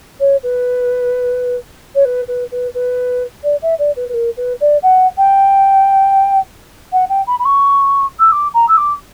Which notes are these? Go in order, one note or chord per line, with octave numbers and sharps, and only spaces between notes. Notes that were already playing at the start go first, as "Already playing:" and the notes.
C#5
B4
C#5
B4
B4
B4
B4
D5
E5
D5
B4
B4
A#4
B4
D5
F#5
G5
F#5
G5
B5
B5
C#6
E6
D6
A#5
E6
D6